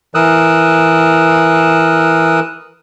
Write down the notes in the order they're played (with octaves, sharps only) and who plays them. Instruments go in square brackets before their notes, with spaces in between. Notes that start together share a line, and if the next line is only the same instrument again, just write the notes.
[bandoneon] E3 A#4 D#6 E6 F#6